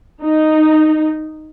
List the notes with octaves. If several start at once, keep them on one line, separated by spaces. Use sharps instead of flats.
D#4